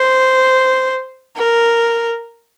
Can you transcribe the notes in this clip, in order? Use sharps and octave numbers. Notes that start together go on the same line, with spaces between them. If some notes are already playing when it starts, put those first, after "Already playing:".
Already playing: C5
A#4